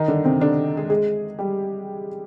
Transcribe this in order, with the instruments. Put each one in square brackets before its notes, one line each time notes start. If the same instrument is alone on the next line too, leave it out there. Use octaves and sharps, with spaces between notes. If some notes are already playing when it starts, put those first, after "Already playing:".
Already playing: [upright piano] D#3 D#4
D3 D4
C3 C4
D3 D4
G#3 G#4
G#3 G#4
G3 G4